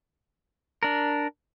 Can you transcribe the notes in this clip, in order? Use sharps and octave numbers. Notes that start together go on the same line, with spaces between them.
D4 A#4